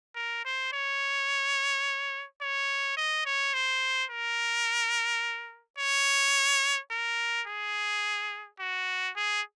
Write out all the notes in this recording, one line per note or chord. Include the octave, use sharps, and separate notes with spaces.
A#4
C5
C#5
C#5
D#5
C#5
C5
A#4
C#5
A#4
G#4
F#4
G#4